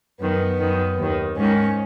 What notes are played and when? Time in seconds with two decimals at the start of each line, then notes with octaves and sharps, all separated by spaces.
0.20 F#2 D#3 B3
0.60 F#2 D#3
0.98 D#2
1.03 D#3
1.37 G#2 D#3 C#4